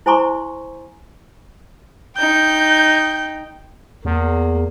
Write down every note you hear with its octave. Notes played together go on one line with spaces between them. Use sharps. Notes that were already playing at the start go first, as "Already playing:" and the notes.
E4 C5 G#5 A#5 C6 C#6
D#4 G5 G6
E2 A#3